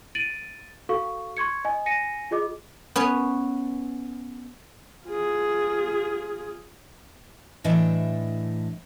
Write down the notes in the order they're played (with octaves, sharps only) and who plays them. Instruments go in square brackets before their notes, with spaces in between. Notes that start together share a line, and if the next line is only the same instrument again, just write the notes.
[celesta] A6 D7 D#7 F#7
F#4 A4 F5 C#6
C6 C#6 G#6 C#7
D#5 G#5
G#5 A#6 C#7 D#7
F4 G#4 D#5 D6
[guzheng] B3 C#4 C#5
[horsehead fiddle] F4 G#4
[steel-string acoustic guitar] A2 E3 D4 D#5 E5